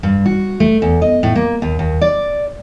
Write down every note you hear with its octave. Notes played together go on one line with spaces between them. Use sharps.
G2
F#4
A3
E2
D#5
A2
A#3
D#2
D#2
D5